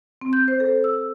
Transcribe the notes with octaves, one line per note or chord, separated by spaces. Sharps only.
C4
G6
C5
A4
E6